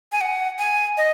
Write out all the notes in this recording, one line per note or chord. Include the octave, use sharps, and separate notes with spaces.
G#5
F#5
G#5
D#5